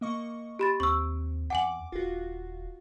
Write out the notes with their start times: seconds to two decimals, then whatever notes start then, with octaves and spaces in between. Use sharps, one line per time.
0.01 A#3 D#5 C#6
0.59 G4 B5 A6
0.80 D#2 C4 C#6 E6
1.50 E2 F#5 G#5 D6 F#7
1.92 D#1 F4 F#4